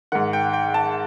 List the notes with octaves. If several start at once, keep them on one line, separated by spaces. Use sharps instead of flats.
G#2 D#3 F#5
G5
G5
A5